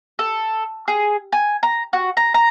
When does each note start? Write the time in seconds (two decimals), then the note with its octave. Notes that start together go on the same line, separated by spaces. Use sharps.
0.19 A4
0.88 G#4
1.32 G#5
1.63 A#5
1.93 F#4
2.17 A#5
2.34 A#5